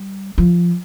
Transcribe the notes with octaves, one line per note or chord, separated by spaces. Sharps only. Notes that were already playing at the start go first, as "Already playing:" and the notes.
Already playing: G3
F3